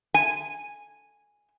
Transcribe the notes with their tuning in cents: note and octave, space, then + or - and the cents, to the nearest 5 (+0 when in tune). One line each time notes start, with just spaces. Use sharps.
G#5 -5